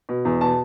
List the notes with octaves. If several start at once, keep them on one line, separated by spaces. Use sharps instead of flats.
B2
E2
B2 A5